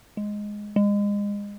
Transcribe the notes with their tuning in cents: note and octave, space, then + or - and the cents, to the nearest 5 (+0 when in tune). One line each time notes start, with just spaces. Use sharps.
G#3 +0
G#3 -30